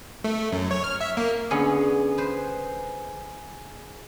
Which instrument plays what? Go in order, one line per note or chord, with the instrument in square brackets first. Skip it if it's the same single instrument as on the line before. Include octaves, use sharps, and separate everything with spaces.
[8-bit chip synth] A3
F#2
C#5
F6
E5
A#3
[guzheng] D3 B3 C#4 [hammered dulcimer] G#4
[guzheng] B4 C5